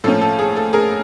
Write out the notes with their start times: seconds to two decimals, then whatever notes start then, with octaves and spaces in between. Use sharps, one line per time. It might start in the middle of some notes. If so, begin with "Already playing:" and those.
0.04 A2 F3 A#3 C#4 A4
0.21 A4
0.39 G#4
0.56 A4
0.73 G#4 A#4